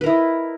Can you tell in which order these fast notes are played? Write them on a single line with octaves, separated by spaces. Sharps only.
B4 A#4 E4 D#5